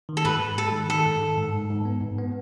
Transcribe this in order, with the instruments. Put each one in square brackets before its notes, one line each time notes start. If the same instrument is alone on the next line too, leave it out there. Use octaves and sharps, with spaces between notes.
[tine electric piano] D#3
[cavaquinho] A4
[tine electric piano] G#2 [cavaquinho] B4
[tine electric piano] G#2
[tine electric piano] G#3 [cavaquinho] A4
[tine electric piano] D#3
[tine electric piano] D#3 [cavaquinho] A4
[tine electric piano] G#2
D#3
G#2
G#2
G#2
B3
G#2
B3